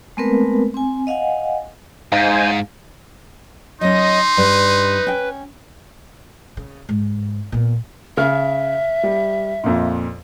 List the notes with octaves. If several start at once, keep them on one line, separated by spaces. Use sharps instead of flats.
G#3 A3 B3 C4 A#4 B4
C4 G#5
D#5 F5 F#5 G#5
G#2 D#4 C5 F5 G#5
F#3 C#4 D#4 D#5 C6
G2 G3 B4
C#4 G5
C#3
G#2
A#2 B3
C#3 E5 F6
G3
F2 A#2